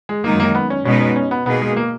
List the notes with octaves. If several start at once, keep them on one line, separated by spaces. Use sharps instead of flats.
G#3
F#2 D#3 G#3 A#3 D#4
A#3
B3
C#4
B2 G#3 B3 C#4 D#4
C#4
C#4
B3
B2 A#3 B3 D#4 G#4
G#3
A#3